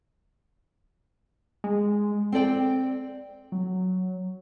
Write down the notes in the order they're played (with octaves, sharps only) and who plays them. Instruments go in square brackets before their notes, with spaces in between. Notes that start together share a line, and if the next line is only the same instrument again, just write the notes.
[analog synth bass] G#3
[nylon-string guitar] C4 A4 D5 G5
[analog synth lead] F#3